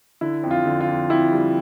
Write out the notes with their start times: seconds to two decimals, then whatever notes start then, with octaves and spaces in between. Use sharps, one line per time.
0.21 D3 E4
0.43 F2
0.51 F4
0.65 D3
0.81 F4
0.88 F2
1.10 F2 E4
1.32 G3